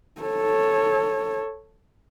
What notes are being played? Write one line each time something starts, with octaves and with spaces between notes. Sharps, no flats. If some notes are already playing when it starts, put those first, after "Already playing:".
A4 C#5